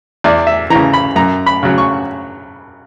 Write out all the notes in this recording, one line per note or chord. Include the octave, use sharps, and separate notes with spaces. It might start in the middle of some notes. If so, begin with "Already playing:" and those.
E2 D5
E5
C#3 E3 A#5
B5
F#2 A#5
B5
C#3 F#3
C#6